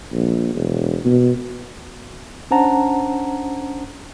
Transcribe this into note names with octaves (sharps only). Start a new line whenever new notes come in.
A#1
E1
B2
C#4 D4 C5 F#5 A5 A#5